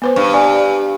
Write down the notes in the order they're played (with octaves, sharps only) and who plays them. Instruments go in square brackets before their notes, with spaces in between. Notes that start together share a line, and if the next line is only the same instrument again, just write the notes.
[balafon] B3 B4 C5
[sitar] G2 [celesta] C#6
[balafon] D5 [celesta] G#5